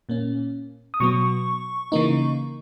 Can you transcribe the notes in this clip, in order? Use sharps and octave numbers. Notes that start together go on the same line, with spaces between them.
A#2 A#3 C#4
D#6
B2 F#3 B3 C#6
C#3 E3 A#3 D#4